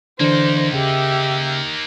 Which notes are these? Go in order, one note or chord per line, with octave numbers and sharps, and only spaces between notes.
D3 E3 A#3 D4 D#4 C5
C#3 G4 E5